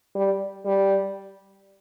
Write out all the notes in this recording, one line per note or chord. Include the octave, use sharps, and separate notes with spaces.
G3
G3